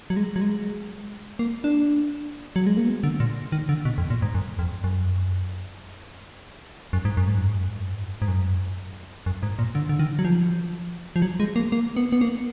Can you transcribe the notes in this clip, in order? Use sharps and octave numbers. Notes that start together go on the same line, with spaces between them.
F#3
G#3
F#3
G#3
A#3
D4
F#3
G#3
A#3
B3
D3
A#2
D#3
D3
B2
F2
A#2
G#2
F#2
F2
F#2
F#2
G#2
F#2
G#2
F#2
G#2
F#2
G#2
F#2
G#2
F#2
F#2
G#2
A#2
D3
D3
D#3
F#3
F3
F3
F#3
G#3
A#3
A#3
B3
B3
A#3